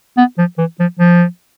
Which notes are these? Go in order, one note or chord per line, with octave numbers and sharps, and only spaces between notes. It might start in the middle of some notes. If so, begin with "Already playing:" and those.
B3
F3
E3
F3
F3